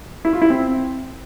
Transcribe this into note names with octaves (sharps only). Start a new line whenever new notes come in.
E4
F4
E4
C4